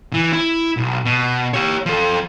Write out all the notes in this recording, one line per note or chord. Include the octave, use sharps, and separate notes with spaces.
E3
E4
B1
B2
G4 C#5
F3 A4